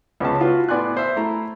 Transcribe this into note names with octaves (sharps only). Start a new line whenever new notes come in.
C#2 B3 C#4 G#4 A5
F4 F#4 B4
A2 B3 D5 G#5 C6 F#6
C5 E5
A3 E4 A#5